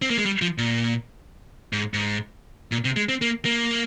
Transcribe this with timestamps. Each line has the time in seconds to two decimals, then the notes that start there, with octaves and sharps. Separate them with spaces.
0.02 C4
0.10 A#3
0.18 G#3
0.25 G3
0.42 F3
0.58 A#2
1.73 G#2
1.94 G#2
2.72 A#2
2.85 C3
2.96 G#3
3.09 C4
3.22 A#3
3.45 A#3